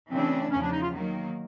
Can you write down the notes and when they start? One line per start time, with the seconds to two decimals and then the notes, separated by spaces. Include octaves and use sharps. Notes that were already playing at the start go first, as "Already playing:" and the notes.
0.10 C#3 E3 A3 C4 D4
0.51 E2 C#3 F3 C#4
0.62 D4
0.72 D#4
0.82 F4
0.93 D#3 F#3 A#3